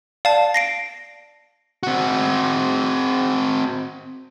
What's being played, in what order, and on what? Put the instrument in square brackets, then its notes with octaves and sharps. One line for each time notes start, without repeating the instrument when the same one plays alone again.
[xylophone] D5 A5 [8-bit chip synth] F5
[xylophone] A#6 C7 D7
[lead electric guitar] C4 F#4